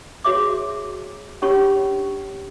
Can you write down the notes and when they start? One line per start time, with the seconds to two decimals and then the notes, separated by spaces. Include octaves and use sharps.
0.24 F#4 G#4 C#5 E5 D6
1.42 C#4 D4 G4 C#5 B5 C#6